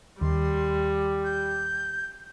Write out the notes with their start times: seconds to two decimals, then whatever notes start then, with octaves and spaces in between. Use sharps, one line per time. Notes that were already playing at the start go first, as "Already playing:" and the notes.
0.21 D#2 D#3 G3 C6
1.25 G6